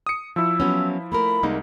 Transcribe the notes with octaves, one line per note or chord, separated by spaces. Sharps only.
D#6 C#7
F3 E4 E6
F#3 B3 C#4
A3 A#3 A#4 B5
C2 G#3 A#3 D#4